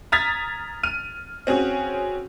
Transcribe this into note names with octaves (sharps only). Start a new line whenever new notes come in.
A#5 D#6 F6 G#6 A6 B6
F6 D#7
C4 C#4 F#4 G#4